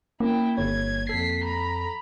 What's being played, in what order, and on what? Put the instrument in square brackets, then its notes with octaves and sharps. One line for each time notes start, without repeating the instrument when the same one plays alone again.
[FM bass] A#3 [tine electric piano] C#4 [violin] E4 G5
[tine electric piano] G1 C#5 [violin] G#6
[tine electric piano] F2 A4 [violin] B6 C7
[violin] A#5 B5